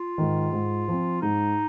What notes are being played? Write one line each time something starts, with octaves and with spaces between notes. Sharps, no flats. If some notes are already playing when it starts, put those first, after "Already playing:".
Already playing: F4
G#2 D#3
G#2
F3 C4
G#2 D#4